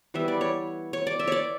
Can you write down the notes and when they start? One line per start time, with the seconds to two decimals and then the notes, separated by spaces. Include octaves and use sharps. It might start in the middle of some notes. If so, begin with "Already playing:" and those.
0.14 E3 G3 B3 E5
0.28 D5
0.41 C#5
0.93 C#5
1.07 D5
1.19 E5
1.27 C#5 D5